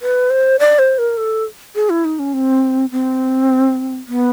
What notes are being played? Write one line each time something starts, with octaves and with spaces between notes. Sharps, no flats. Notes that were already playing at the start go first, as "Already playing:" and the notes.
B4
C5
D5
C5
A#4
A4
G#4
E4
D#4
C#4
C4
C4
B3